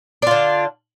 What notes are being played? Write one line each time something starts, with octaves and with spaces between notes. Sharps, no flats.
D3 D4 F4